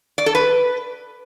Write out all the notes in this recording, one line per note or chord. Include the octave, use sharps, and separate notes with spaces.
D5
A4
B4